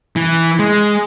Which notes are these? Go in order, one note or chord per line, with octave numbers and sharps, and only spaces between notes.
E3
G#3